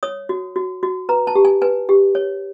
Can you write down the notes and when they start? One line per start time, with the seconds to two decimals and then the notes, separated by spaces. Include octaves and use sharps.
0.03 C#5 D#6
0.29 F#4
0.56 F#4
0.83 F#4
1.09 B4 A#5
1.27 A5
1.35 G4
1.45 G#5
1.62 B4 G#5
1.89 G4
2.15 C#5